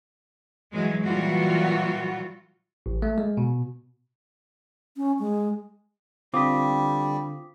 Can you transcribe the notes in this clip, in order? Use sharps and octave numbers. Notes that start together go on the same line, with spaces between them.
E3 F#3 G#3
A#2 E3 F#3 G3 F4 F#4
A1
A3
G#3
B2
C#4
G#3
D3 G3 C4 F4 D6 D#6 B6